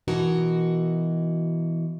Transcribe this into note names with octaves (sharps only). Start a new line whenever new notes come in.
B2 E3 D#4 F#4 A#4